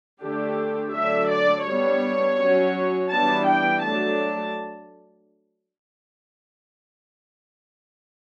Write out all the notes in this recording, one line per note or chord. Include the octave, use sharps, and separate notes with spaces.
D3 A3 D4 G4
D3 F#3 A3 D4 E5
D5
G3 B3 D4 C#5
F#3 C#4
E3 G3 B3 D4 A5
G5
F#3 A3 D4 A5